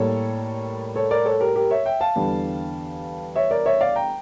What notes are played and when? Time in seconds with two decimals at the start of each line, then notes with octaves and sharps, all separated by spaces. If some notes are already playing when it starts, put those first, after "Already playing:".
Already playing: A2 G3 A#3 A4 C#5
0.96 A4 C#5
1.11 A#4 D5
1.25 A4 C#5
1.40 G4 A#4
1.56 G4 A#4
1.71 C#5 E5
1.86 E5 G5
2.01 F5 A5
2.16 E2 D3 G3
3.36 C#5 E5
3.51 A#4 D5
3.66 C#5 E5
3.81 D5 F5
3.96 G5 A#5